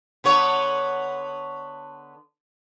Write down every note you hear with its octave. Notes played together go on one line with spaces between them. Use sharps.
D3 B3 C#5